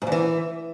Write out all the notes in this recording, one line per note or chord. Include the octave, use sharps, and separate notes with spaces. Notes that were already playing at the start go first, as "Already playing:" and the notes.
G#2
E2
E3